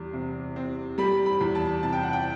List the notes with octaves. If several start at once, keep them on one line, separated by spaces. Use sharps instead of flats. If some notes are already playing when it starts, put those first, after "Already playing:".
Already playing: E2 G3
C3
C4
G3 B5
B5
E2
A5
C3 A5
G5
F#5
G5